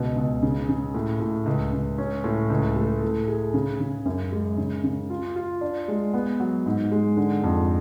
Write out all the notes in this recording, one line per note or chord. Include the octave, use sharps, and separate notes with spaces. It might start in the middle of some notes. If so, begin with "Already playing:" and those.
Already playing: C#2 B2
C#2
C#3
C#3
A2
A2
C#2
C#2
C#4
A2
C#2
A3
A2
G#4
C#3
C#3
F#2
G#3
C#3
C#3
F4
F4
D4
G#3
B3
F#3
G#2
G#3
D3
F2